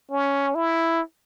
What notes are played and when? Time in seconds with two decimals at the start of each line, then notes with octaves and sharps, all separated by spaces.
0.11 C#4
0.55 E4